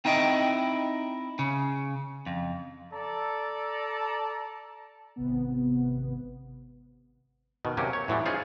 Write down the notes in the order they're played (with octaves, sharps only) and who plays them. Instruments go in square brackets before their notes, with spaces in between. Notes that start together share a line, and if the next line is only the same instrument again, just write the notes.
[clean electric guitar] C4 D#4 E4 D#5 G5
C#3
F2
[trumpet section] A4 D5 A5 A#5
[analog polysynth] G#1 C3 B3
[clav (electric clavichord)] B2 D#3
C3 F#3 A#3 C#4 G4
C#5
A2 E3 F#3 G3
C#4 D#4 F4 G#4 C5